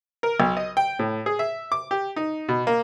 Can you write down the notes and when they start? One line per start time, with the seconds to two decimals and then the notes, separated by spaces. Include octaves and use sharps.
0.23 A#4
0.40 B1
0.57 D#5
0.77 G5
0.99 A2
1.26 G#4
1.39 E5
1.72 D6
1.91 G4
2.16 D#4
2.49 B2
2.67 A#3